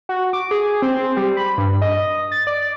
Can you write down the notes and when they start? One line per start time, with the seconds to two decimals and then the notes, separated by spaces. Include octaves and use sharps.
0.09 F#4
0.33 D6
0.51 G#4
0.82 C4
1.17 G3
1.37 B5
1.58 G2
1.82 D#5
2.32 A6
2.47 D5